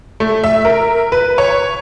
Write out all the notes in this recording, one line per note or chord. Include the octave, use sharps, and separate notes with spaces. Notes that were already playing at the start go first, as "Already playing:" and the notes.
A3
E5
A#4
B4
C#5